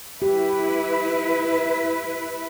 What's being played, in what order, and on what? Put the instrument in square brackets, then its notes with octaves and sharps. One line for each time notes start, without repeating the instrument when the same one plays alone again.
[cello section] E4 B4 [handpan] G4